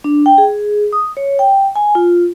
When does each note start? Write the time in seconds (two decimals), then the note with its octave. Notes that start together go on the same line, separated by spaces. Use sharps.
0.04 D4
0.26 G5
0.38 G#4
0.93 D#6
1.17 C#5
1.39 G5
1.76 G#5
1.95 F4